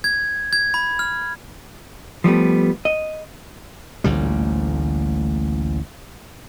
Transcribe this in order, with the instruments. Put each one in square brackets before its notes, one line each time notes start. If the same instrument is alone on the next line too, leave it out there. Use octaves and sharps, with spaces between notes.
[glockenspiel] G#6
G#6
B5
F6
[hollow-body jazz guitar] F3 G3 A3 B3
D#5
[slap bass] A1 D2 A#2 G3